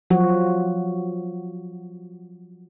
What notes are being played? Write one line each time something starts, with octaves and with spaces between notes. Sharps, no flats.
F3 F#3 F#4